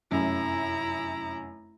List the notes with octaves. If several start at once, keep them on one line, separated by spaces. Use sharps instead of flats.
F1 F#2 C#4 E4 A#5